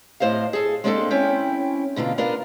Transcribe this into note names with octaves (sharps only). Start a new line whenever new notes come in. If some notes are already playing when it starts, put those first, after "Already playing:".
A2 C5 D#5 F5
G#4 A4
G#3 A#3 C4 D4 G4 A4
C4 C#4 E4 G5
B2 D3 A#3 F4
B3 D4 F4 A#4